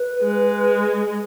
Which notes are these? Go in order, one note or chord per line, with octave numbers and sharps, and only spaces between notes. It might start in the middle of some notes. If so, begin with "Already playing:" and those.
Already playing: B4
G#3